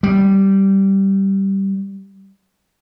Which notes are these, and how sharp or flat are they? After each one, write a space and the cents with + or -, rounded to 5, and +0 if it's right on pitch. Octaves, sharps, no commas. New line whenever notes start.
G3 -10